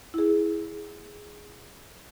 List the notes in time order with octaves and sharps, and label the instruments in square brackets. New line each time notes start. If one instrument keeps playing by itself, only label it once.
[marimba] E4 G#4